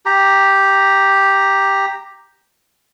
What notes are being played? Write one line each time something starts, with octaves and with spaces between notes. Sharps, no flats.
G4 A#5